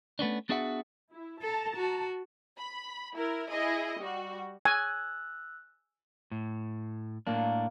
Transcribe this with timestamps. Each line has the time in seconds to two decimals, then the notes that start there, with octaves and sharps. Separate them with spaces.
0.19 A3 B3 C#4 D4
0.49 B3 D4 F#4 G#4 E5 F#5
1.11 E4
1.42 A4 A5 A#5
1.76 F#4
2.57 B5
3.14 E4 A#4
3.50 E4 G#4 D#5
4.00 G3 F#4
4.65 G#5 E6 F#6
6.32 A2
7.27 A2 A#3 D4